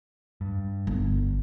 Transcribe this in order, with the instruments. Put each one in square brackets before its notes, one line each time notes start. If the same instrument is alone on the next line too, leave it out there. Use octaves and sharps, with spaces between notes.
[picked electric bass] G2
[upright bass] G1